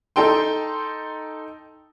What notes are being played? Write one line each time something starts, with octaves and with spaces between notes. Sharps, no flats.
D#4 A4 G5 C6